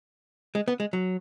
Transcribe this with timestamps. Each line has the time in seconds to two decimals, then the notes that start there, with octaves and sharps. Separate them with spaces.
0.55 G#3
0.68 B3
0.80 G#3
0.93 F#3